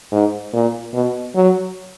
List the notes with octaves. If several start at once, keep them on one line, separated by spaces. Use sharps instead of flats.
G#2
A#2
B2
F#3